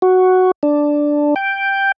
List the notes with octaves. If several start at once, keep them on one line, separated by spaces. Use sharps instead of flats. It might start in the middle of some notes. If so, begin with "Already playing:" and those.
F#4
D4
G5